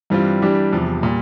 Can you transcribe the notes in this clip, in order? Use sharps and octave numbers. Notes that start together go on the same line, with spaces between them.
G2 E3 G3 C4 F4
E3 G3 D4 G4
E2 C3 F3
A#2 G3